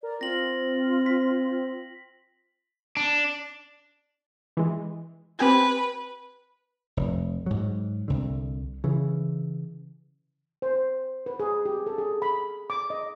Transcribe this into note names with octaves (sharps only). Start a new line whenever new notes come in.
A#4 D5
C4 F4 A#6 F#7
B6
D4
E3 G#3
C4 G4 B4 G#5
F1
G#2 F#3
C2 D3
C#3 E3
C5
B4
G#4
G4
A4
G#4
B5
D6
D#5